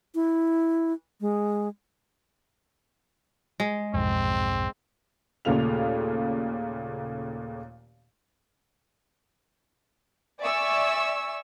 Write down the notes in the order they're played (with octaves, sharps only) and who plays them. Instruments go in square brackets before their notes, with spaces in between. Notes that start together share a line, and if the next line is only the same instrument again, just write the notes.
[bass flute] E4
G#3
[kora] G#3
[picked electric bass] B1 F2 G#2 [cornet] C4
[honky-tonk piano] D#2 A#2 C#3 A3 F4 F7
[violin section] D5 E5 G#5 C#6 E6